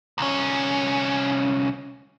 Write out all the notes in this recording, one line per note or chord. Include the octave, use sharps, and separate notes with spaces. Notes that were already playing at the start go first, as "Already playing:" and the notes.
C2 C#4